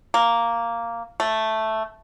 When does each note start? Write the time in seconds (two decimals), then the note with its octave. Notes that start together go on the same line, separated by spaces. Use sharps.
0.14 A#3
1.20 A3